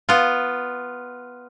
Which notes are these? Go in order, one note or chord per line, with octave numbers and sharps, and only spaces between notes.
B3 F4